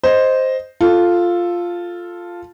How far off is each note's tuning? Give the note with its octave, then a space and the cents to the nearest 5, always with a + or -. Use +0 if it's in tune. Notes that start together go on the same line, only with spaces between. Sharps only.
C5 +0 D#5 +0
F4 +0 A4 +0